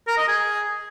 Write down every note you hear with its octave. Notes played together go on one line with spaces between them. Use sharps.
A#4
D#5
G#4